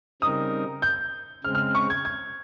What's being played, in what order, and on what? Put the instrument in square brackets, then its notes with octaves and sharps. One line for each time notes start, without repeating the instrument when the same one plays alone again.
[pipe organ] C#3 G3 C4 D#4 A#4 [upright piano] D#6
[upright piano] G6
[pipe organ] C#3 G#3 C4 [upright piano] F6
[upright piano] F6
C#6
G#6
G#6